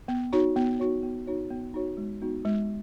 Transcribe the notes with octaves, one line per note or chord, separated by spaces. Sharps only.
B3
D#4 F#4 C#5
B3
D#4 F#4 C#5
B3
D#4 F#4 C#5
B3
D#4 F#4 C#5
G#3
B3 D#4 F#4
G#3